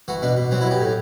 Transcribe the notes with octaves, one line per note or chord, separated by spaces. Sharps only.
E3 F#4
B2 D4
B2
F#3 C4
E4
F#3
G4
A2